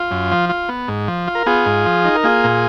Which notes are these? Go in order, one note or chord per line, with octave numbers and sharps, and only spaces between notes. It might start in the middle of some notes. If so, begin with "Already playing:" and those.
Already playing: F4
F#2
F3
F4
B3
G#2
F3
F4
A#4
B3 F4 G#4
G#2
F3
D#4
A#4
A#3 F4 G#4
A#2